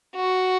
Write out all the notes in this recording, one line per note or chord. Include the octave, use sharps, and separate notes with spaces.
F#4